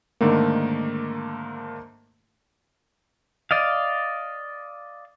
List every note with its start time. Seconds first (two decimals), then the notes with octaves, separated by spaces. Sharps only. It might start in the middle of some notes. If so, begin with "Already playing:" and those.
0.21 G#2 D3 D#3 A3 A#3
3.51 D5 D#5 F5